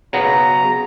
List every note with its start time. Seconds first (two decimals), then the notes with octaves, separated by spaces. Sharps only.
0.13 C#3 F#3 B3 A#5